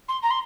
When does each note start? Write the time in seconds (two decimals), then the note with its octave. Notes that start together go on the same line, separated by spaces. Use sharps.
0.08 C6
0.23 A#5
0.31 C6